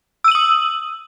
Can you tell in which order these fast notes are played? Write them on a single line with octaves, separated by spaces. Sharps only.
E6 D#7 F#7 D#6